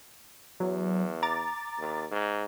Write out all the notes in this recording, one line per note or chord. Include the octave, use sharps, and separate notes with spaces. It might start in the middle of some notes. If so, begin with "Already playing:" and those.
E2 F#3
A#5 D6 A6
D#2
G#2